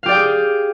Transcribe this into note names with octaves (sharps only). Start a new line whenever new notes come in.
G4 G#4 D5 F5 G5